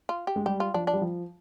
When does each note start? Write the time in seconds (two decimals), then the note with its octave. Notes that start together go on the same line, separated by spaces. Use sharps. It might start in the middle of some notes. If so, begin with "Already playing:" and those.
0.09 F4
0.27 G4
0.36 G#3
0.46 G3 G4
0.60 F4
0.74 F3 D4
0.87 D4
0.93 G3
1.01 F3